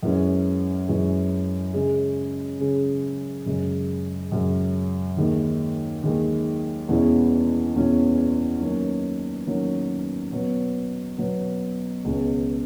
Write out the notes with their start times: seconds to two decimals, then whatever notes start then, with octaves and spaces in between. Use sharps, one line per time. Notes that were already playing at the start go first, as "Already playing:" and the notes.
0.03 F#2 E3 G#3 C#4
0.88 F#2 E3 G#3 C#4
1.73 C#3 G#3 C#4 G#4
2.60 C#3 G#3 C#4 G#4
3.46 F#2 C#3 G#3
4.32 F#2 C#3 G#3
5.17 D#2 D#3 G#3
6.03 D#2 D#3 G#3
6.88 E2 B2 G#3 C#4 E4
7.75 E2 B2 G#3 C#4 E4
8.60 D#3 F#3 A#3 C#4
9.46 D#3 F#3 A#3 C#4
10.32 B2 F#3 B3
11.18 B2 F#3 B3
12.04 C#2 B2 G#3 C#4